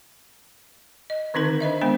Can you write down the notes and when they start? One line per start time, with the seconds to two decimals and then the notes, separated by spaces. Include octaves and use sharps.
1.10 D#5
1.34 D3 D#3 C4 D#4 A#4 B4
1.61 D4 C5 D#5 E5
1.81 G#3 B3 D4 C5